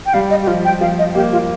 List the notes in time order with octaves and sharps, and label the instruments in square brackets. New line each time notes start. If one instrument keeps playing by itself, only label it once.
[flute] G5
[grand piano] G3 [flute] F5
[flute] D#5
G4
[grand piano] F3 [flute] F4
[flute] G5
[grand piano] F3 [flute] F5
[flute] D#5
[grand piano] A#3 [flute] G4
[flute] F4